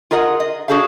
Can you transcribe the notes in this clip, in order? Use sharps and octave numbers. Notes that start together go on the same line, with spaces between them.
F4 G#4 A#4 D#5 F#5
D#5
D4 F#4 G#4 A4 C5 F5